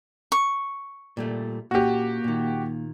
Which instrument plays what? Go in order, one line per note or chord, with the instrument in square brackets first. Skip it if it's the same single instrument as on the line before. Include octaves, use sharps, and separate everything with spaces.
[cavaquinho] C#6
[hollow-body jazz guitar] A#2 G3 A3
[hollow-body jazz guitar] A#2 C#4 [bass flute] A#3 [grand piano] F#4 G4
[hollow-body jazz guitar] A#2 D#3